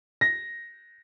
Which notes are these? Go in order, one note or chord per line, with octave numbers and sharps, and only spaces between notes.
A#6